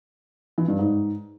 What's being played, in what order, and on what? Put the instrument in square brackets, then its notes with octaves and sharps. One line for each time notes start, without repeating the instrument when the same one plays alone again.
[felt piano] E3
G2
G#2